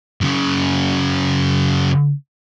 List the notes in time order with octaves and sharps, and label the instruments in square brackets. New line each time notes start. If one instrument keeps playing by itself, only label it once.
[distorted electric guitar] F#2 C#3